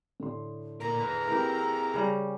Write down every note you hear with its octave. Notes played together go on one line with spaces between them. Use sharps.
A2 D3 C6
A#2 A#4 A#5
G#4 B4
C4 E4 G4 A#4
C#3 G3 C#4